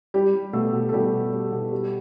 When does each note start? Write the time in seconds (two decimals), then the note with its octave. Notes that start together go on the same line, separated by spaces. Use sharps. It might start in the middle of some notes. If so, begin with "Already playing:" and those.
0.14 G3 G4
0.34 G3
0.53 B2 A3 A4
0.73 B2
0.89 A4
0.93 B2 G3 G4
1.13 B2
1.33 G3
1.52 B2
1.71 G3